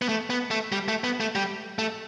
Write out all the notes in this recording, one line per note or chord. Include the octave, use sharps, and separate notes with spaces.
B3
A3
B3
A3
G3
A3
B3
A3
G3
A3